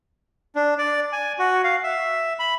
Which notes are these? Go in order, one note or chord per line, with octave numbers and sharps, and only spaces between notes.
D4
D5
G#5
F#4
F5
E5
B5